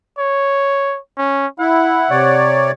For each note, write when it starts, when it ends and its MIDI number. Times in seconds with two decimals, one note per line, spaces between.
0.18 0.99 73
1.17 1.46 61
1.59 2.10 64
1.59 2.47 78
2.10 2.71 48
2.10 2.71 73
2.10 2.71 74